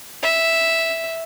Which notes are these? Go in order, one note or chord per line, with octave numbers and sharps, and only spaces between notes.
E5